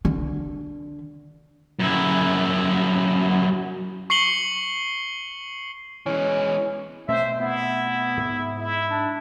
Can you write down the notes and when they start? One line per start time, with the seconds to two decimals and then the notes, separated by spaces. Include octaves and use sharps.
0.05 D3
1.79 F#2 E4
4.10 C#6 C7 C#7 F#7 G7
6.06 E3 G#3 C#4
7.08 B2 A3 C4 C5 E5
7.38 B3 E4
8.17 G#2
8.57 E4
8.89 D4